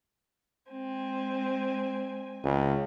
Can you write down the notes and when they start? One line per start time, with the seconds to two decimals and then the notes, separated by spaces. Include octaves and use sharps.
0.70 G#3 C4 G#5
2.44 C#2